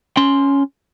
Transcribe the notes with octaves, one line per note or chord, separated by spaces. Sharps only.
C#4 C6